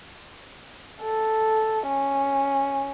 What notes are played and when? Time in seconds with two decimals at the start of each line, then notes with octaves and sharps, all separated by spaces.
1.03 A4
1.88 C#4